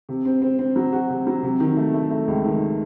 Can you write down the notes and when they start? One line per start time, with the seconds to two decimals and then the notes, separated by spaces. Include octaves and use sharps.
0.09 C3
0.25 C4
0.42 C4
0.59 C4
0.76 F#3
0.93 F#4
1.10 C3
1.27 F#3
1.43 C3
1.60 D#3
1.77 A3
1.94 A3
2.11 A3
2.28 C#2
2.45 D#3